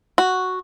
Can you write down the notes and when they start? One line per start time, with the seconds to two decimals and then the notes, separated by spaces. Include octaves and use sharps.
0.18 F#4